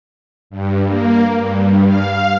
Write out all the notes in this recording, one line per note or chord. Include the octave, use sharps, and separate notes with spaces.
G2
A#3
G2
F5